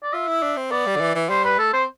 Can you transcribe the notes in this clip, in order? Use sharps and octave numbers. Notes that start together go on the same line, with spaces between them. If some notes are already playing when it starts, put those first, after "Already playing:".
D5
F4 E5
E4
D4
C4
B3 D5
G3
D3
E3
E3
G3 C5
B4
A3 A4
C4 C5